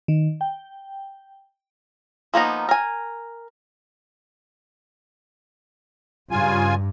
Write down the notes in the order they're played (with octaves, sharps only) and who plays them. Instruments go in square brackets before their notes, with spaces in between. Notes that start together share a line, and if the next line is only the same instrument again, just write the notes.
[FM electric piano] D#3
G5
[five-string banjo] F3 A#3 B3 D#4
A#4 G#5
[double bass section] G2 [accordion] C#3 F4 G#5